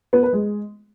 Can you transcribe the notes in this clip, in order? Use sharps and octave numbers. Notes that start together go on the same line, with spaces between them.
B3
B4
G#3